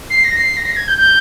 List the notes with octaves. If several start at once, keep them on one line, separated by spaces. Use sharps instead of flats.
C7
A#6
C7
A#6
C7
A#6
G#6
G6
G6